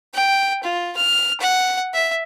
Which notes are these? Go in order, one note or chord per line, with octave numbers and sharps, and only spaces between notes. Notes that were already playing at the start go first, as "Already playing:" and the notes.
G5
F4
F6
F#5
E5